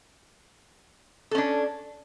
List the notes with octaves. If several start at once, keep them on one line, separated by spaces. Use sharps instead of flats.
C#4 D4 A4